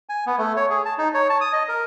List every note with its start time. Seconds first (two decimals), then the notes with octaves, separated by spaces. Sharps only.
0.09 G#5
0.26 B3
0.38 A3
0.57 C#5
0.70 G#4
0.85 A5
0.98 D#4
1.14 C#5
1.30 A5
1.41 D#6
1.53 D#5
1.69 A#4